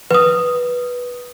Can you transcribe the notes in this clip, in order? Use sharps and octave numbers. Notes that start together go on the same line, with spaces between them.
B4 D#6